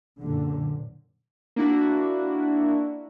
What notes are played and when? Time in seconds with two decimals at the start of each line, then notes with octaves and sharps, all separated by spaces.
0.19 F#1 A#2 D3
1.56 A#3 D4 E4 F#4